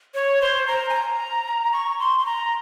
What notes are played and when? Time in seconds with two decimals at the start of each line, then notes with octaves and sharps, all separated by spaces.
0.14 C#5
0.41 C5
0.67 A#5
0.89 G#5
0.94 A#5
1.73 C#6
1.99 C6
2.19 C6
2.26 A#5